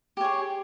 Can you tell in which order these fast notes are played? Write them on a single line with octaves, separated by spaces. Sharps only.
G4 C#5 G#4